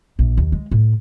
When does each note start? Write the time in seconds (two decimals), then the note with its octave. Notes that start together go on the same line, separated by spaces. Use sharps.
0.19 A#1
0.37 D#2
0.52 G#3
0.71 A2